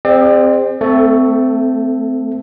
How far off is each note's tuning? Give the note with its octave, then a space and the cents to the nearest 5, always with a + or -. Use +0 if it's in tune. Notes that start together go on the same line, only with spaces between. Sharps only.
C4 +0 G#4 -35 D5 +40
A3 +20 C4 -25 A4 -10